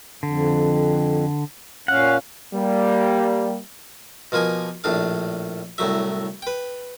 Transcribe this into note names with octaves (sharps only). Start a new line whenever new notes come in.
F2 D3
A#2 C#4 F5 F#5
G3 A#3
B2 F3 A#3 G#5
A#1 A2 D4 F5
C2 A2 F#3 E5
B4 G5